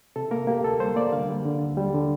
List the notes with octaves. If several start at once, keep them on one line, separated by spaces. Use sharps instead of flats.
C3 A4
A#3 A#4
A#3 G4
D2 A4
G3 C5
A#3 D5
D3 F5
G3
D3
D#2
G3
D3